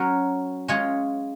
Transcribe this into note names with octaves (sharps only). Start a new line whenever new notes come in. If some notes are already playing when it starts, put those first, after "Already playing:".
Already playing: F#3 C#4 F#4 A#4
G#3 C#4 F4 G#4 C#5